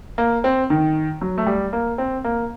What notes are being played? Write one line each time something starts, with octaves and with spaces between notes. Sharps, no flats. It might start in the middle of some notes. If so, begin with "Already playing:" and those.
A#3
C4
D#3
F#3
A3
G3
A#3
C4
A#3